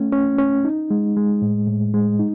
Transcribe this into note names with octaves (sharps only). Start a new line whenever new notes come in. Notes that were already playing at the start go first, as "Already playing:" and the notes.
Already playing: A3 C#4
C#4
C#4
D#4
G#3
G#3
A2
A2
G#3
D#4